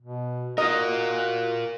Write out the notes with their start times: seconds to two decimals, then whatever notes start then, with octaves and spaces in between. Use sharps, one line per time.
0.01 B2
0.58 F4 F#4 A#4 D#5